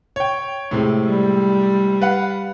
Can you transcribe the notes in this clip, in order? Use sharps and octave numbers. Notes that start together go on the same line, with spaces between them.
C#5 G5
A2 C3 G#3
G3
B4 F5 F#5